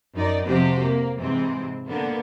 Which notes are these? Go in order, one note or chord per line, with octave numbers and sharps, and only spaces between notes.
F#2 D#4 D5
F2 C3 F3 F#4 G4 C5
A#3
G#2 C3 E3 G#3 C4
D3 A#3 B3